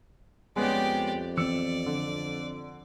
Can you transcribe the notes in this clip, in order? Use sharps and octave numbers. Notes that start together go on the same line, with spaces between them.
F2 G#3 B3 C#4 G4 D5
E3 B3 C4 D5 E6 C#7
D3